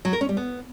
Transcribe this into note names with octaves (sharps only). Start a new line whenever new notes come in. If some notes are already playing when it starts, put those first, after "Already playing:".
F#3
A#4
C#4
G3
B3